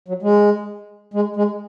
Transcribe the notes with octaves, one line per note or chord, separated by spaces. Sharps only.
F#3
G#3
G#3
G#3